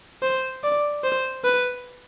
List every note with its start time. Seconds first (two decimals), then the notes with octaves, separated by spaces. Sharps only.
0.23 C5
0.64 D5
1.04 C5
1.45 B4